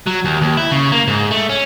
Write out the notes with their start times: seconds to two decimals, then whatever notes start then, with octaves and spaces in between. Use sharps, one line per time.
0.06 F#3
0.25 D#2
0.41 D#2
0.57 E4
0.71 C#3
0.92 A#3
1.08 G#2
1.31 A3
1.49 C#4